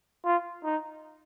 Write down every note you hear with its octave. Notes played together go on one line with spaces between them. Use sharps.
F4
D#4